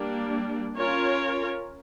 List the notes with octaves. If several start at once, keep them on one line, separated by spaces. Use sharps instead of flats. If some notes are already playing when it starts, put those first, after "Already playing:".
Already playing: G3 A#3 D4
C#4 F4 A#4 C#5